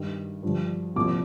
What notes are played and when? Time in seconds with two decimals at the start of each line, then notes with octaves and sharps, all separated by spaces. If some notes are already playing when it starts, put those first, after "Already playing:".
Already playing: G2 D#3
0.43 G2 D3 F3
0.96 C2 A#2 F3 D6